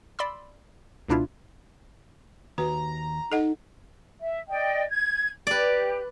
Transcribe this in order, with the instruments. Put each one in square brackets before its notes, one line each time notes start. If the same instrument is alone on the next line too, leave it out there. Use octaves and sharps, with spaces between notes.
[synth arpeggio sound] D5 B5 C6 E6
C#2 B2 D4 E4 F4
[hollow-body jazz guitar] D#2 [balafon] F#4 B4 [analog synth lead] A#5
[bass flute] D#4 [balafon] A4 D#5 F#5
[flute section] E5
D5 D#5 G5
G#6
[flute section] G4 [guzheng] B4 D5